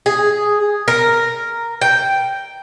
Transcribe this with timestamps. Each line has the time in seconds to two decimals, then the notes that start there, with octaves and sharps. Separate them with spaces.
0.06 G#4
0.88 A#4
1.81 G5